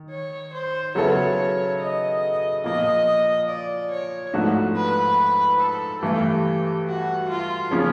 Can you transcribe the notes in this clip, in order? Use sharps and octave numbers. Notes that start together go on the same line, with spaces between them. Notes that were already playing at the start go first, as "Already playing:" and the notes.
Already playing: D#3
C#5
C5
C#3 F#3 B3 E4 A4 C#5
D#5
A#2 F3 A#3 D#5
D5
C#5
G#2 F3 A3 D4 F#4
B4
A4
G2 E3 A3 G4
F#4
F4
C#3 F3 A#3 C#4 F4